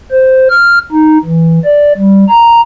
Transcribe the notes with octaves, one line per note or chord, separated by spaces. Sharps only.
C5
F6
D#4
E3
D5
G3
A#5